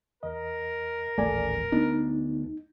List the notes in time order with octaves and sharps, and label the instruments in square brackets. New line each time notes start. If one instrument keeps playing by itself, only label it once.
[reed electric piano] E2 D#5 [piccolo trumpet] A#4
[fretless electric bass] D#1 A1 A3 [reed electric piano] A4 D5 G#5
[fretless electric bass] D2 B3 D4 [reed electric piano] D#4